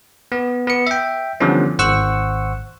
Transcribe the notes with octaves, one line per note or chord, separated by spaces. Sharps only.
B3
B3 C#7
E5 G5
D3 E3 F3 G3 B3 C#4
G#1 C5 F#5 C#6 E6